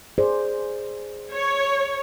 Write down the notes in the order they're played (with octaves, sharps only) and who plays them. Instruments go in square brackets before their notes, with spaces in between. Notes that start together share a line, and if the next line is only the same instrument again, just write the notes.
[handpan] G#4 C5 D5
[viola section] C#5